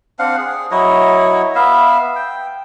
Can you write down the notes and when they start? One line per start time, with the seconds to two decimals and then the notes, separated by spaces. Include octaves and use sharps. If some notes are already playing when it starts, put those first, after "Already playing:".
0.19 C4 D4 F5 F#5
0.38 G#4
0.71 F#3 E4 C#5 D#5
1.55 B3 E5 F5
2.16 G5